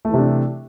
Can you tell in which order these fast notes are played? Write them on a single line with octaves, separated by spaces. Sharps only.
A3 E3 C3 D4